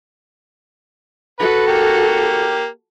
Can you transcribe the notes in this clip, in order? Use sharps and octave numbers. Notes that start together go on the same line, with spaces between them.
F#4 A4 B4
A#3 G4